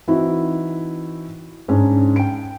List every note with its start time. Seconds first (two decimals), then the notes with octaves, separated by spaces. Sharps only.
0.08 E3 C4 D#4 E4 F#4
1.68 G#2 C#4 D4
2.16 G5 D7